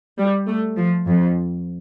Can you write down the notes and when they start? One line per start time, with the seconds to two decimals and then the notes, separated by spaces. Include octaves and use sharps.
0.19 G3
0.48 A3
0.77 F3
1.06 F2